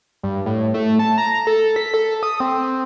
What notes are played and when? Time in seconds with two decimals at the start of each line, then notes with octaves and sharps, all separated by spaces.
0.23 G2
0.46 A2
0.74 A3
0.99 A5
1.18 A#5
1.47 A4
1.76 B6
1.94 A4
2.23 D#6
2.40 C4